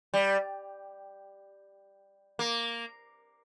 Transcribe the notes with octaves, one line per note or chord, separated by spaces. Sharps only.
G3
A#3